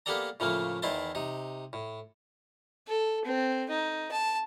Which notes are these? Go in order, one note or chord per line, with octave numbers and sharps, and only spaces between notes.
A#3 B3 G4 A4 D5 A#5
A2 C#3 F3 A3 A#3
E2 D#3 E4 C5 A5
C3 D#4
A2
A4
C4
D#4
A5